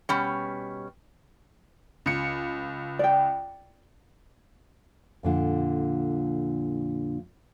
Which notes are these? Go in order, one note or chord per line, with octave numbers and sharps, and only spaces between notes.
B2 G3 C#4
C#2 C#7
D5 G5
F2 A#2 D3